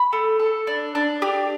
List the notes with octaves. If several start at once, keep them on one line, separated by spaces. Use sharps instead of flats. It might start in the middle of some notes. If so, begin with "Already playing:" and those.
Already playing: B5
A3
A4
D4
D4
G4